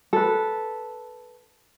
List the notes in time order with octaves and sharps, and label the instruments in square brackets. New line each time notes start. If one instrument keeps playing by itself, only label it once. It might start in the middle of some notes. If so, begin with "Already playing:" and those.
[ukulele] A4 B4